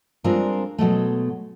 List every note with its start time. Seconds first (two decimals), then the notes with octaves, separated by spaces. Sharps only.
0.24 G3 G#3 C4 D4 F4 A#4
0.78 B2 F#3 G#3 A3